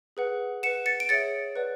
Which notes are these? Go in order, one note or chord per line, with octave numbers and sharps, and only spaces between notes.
G#4 B4 F#5
B4 F#5 C#7 E7
A6 C#7
D7
G#4 C#5 E5 A6 C#7
B4 D5 F#5